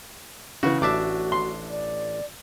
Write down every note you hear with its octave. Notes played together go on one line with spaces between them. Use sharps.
C#3 E3 F#4
A1 D4 F#4 E5 D6
C6
D5